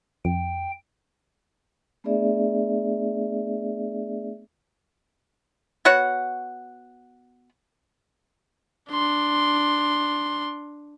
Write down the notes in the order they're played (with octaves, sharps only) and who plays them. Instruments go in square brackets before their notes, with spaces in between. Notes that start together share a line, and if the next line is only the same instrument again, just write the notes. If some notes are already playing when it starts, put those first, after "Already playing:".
[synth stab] F2 [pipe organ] G5
[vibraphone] A3 B3 D4 G#4 D5 E5
[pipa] B3 F#4 C#5 F#5
[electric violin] D4 C6